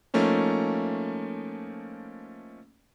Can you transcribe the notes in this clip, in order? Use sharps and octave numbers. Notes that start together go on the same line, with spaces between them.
F3 A3 A#3 C#4 D#4